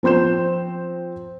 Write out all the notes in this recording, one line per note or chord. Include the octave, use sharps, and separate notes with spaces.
F3 C4 C6 G6 E7